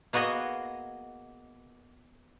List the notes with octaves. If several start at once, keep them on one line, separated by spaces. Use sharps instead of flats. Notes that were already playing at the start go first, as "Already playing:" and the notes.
A#3 B3 F#4 G#4 D#5